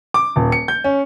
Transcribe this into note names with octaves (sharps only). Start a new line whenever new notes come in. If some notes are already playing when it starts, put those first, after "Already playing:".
D6
D#1
C#7
G6
C#4